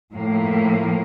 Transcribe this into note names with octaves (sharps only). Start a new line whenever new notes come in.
A2 F3 A#3